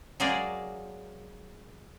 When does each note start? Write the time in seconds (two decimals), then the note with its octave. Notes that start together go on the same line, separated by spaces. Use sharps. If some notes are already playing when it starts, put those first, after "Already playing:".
0.20 F#3 G#3 A#3 G#4 A#4 D5